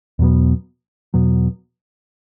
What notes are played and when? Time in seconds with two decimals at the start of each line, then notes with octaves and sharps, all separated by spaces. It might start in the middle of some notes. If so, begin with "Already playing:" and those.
0.19 E2 B2 F#3 B3
1.14 E2 B2 F#3 B3